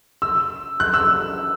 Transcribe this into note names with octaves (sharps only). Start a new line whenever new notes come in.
E6
F#6
E6